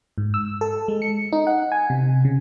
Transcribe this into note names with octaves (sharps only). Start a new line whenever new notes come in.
G#2
E6
A4
G#3
C#7
D#4
F#5
G#5
C3
C#3